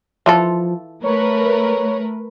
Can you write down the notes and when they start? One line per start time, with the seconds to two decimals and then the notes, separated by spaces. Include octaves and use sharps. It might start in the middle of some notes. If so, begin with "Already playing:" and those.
0.26 E3 F3 F4 A4
1.03 A3 A#4 B4 C#5